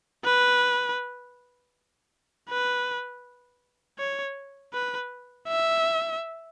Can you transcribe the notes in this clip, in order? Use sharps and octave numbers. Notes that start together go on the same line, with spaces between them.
B4
B4
C#5
B4
E5